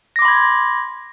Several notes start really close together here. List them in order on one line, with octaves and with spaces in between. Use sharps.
A#6 D6 C6 B5 G#6